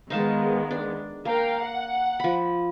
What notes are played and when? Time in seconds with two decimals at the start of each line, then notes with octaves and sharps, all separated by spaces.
0.10 D#3 G#3 B3 D#4 F5 A5
0.71 D4
1.25 A#3 A#4 F5 G5
1.61 F#5
2.20 F3 B5